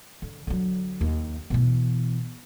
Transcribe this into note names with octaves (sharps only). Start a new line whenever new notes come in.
D3
D3 F#3
D#2
B2 E3